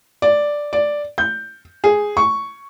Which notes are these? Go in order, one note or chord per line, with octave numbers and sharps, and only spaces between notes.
D5
D5
G6
G#4
C#6